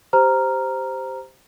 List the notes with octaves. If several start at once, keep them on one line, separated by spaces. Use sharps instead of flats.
G4 C5 A#5 F6